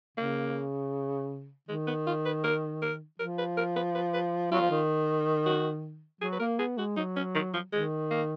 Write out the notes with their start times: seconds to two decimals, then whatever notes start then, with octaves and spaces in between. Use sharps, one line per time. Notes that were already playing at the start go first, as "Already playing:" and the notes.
0.17 C#3 A#3
1.69 D#3 G#3
1.87 B3
2.07 F4
2.25 B4
2.44 A#4
2.82 A#4
3.19 F3 A#4
3.38 B4
3.57 A#4
3.76 B4
3.95 B4
4.14 B4
4.52 F#3 F4
4.61 F3
4.71 D#3
5.46 F#4
6.21 F#3 G#4
6.32 B4
6.39 A#3 A#4
6.59 B3 G#4
6.78 G#3 F#4
6.96 F#3 D#4
7.16 C#4
7.34 D#3
7.54 F3
7.72 D#3 G#3
8.10 A#3